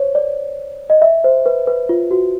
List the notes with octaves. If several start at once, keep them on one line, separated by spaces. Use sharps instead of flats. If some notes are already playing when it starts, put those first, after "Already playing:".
Already playing: C5 C#5
D5
D#5
E5
C5
B4
B4
F4
F#4